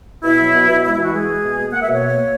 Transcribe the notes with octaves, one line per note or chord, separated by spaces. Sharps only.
B2 E4
F#3
B2
B2
G#3 E4
E3 E4
F#4
G#3 G#4
G#3
B2
A#3
A#3 F#5
E5
B2 C#5
A#3
A#3